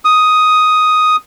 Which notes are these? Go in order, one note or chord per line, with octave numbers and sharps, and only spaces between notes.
D#6